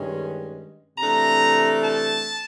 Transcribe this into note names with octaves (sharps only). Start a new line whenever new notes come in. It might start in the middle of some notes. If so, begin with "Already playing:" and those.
Already playing: G2 D#3 G#3 C#4
C3 E3 A3 D4 A#5
A5